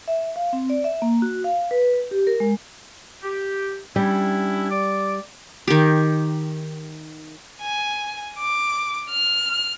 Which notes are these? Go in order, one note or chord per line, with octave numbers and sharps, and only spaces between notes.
E5
F5
C4
D5
E5
A#3
F#4
F5
B4
G4
A#4
G#3
G4
G3 C#4 D4 E4
D5 D6
D#3 G4
G#5
D6
F6